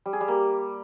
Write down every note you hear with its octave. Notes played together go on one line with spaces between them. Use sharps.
G3
G#4
G3
A#3